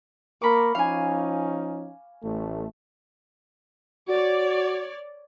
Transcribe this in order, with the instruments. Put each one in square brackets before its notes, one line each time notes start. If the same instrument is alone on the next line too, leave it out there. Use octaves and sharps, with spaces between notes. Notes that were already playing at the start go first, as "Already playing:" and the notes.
[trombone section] A#3 A#4 [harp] B5 C#6 D6
[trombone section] F3 C#4 D#4 [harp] F5 G#5
[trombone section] A1 A3
[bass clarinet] F#4 [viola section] C#5 D5